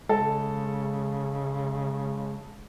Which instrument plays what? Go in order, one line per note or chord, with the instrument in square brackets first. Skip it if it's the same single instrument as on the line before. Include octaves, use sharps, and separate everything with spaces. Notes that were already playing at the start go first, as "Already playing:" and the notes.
[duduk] C#3 [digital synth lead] G#3 [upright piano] A4